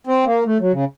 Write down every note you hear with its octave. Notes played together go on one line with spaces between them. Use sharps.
C4
A#3
A3
F#3
C#3